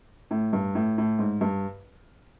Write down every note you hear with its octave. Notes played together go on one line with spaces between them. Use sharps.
A2
G2
A2
A2
G#2
G2